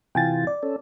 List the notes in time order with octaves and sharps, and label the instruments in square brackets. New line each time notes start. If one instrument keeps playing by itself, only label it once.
[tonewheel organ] C3 E3 F4 [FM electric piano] G5 G#5 A6
[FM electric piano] D5
[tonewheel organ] C#4 A4